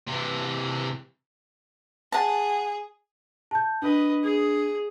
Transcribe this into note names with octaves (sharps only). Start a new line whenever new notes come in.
C3 E3
G#4 F#5 A5
A5 G6
D4 B4 D#5
G#4